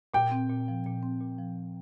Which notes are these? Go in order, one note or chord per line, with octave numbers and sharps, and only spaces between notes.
A#2 G5
C4
A#2
F3
A#2
C4
A#2
F3